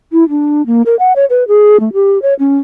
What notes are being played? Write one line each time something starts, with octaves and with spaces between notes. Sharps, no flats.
E4
D4
A#3
A#4
F#5
C#5
B4
G#4
A3
G4
C#5
C#4